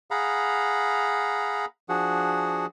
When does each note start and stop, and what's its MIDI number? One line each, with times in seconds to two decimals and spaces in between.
0.11 1.65 68
0.11 1.65 77
0.11 1.65 78
0.11 1.65 82
0.11 1.65 83
1.89 2.66 53
1.89 2.66 62
1.89 2.66 66
1.89 2.66 68
1.89 2.66 78